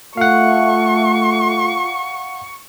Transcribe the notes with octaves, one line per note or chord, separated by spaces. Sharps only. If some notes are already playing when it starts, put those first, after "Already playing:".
A3 F4 F5 F#5 C#6